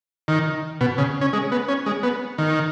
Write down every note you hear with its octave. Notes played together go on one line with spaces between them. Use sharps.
D#3
B2
C#3
C#4
G#3
B3
C#4
G#3
B3
D#3